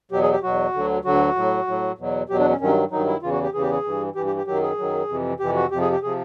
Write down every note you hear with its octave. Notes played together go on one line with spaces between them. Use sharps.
E2 B2 F#3 G4
G#4
G4
E2 B2 F#3 F#4
D2 D3 F#3
D2 D3 F#3 F#4
A2 F#3
A2 F#3
E2 B2 F#3
E2 B2 F#3 G4
D4
C#4
G2 D#3 F#3 C#4
G2 D#3 F#3 D#4
E4
E2 C#3 E3 F4
F#4
G4
E2 C#3 E3 G#4
G4
G#4
G2 E3
G2 E3 G4
G4
G4
F#2 D#3 F#3 G4
G#4
F#2 D#3 F#3
F2 C3 E3
F2 C3 E3 G4
F#4
F2 C3 F3 G4
G#4
G4
C3 F3 G#4